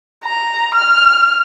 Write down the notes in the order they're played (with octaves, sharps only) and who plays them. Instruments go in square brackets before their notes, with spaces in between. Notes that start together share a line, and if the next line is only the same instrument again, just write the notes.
[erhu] A#5
F6